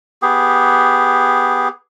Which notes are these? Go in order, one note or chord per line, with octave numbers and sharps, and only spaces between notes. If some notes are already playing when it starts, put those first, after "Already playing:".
B3 G4 G#4